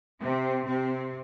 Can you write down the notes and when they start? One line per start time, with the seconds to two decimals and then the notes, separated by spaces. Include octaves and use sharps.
0.20 C3 C4
0.66 C3 C4